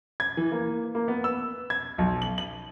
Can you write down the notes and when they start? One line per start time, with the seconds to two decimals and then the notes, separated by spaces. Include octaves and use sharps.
0.20 G#6
0.37 E3
0.52 A#3
0.95 A#3
1.08 B3
1.24 E6
1.70 G#6
1.98 B1
2.22 F#7
2.38 F#7